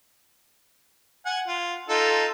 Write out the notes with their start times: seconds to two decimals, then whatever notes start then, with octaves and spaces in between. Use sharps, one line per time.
1.26 F#5 G#5
1.48 F4
1.89 D#4 F4 A4